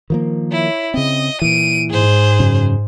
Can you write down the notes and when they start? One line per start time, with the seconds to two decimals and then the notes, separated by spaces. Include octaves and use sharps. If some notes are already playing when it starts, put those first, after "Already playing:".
0.10 D#3 F3 A#3
0.51 E4 C#5
0.94 C#3 C4 D#5
1.42 A#2 E3 D7 D#7
1.90 G#2 G#4 C5
2.39 F#2 C#3